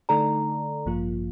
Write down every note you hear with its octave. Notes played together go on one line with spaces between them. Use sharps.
D3 A3 D#4 A4 D5 A#5
A1 G2 F3 A#3 F4